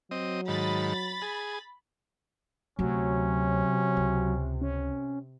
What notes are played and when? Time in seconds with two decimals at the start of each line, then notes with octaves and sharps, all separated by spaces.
0.11 F#3 C4 D#5
0.48 G#2 D#3 B5 A6
1.22 G#4
2.79 D2 C3 F#3 C#4
3.97 C#2
4.61 C#4